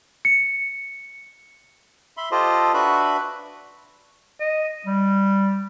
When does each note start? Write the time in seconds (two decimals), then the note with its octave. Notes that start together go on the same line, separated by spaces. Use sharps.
0.25 C#7
2.17 E5 B5 C6
2.31 F4 G4 A4 C5 D#5
2.74 D4 F#4 B4 E5 B5
4.40 D#5
4.86 G3